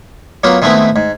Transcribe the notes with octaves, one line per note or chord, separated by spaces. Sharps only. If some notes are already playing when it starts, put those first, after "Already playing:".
F#3 A#3 B3 F4
D#3 G#3 A3 B3 C4 E4
G#2